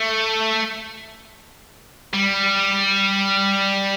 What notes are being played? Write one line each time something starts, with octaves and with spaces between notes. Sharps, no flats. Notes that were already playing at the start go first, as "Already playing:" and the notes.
Already playing: A3
G3